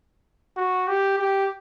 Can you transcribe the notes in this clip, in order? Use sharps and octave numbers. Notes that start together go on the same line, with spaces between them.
F#4
G4
G4